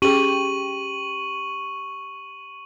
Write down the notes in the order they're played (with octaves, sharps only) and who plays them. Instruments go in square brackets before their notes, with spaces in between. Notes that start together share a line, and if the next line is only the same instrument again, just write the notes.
[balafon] C#4 G#4 [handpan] G4 [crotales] C#6 D#7 F#7